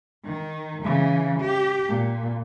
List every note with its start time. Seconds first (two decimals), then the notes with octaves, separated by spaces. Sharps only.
0.25 D#3
0.82 C#3 E3
1.40 G4
1.89 A#2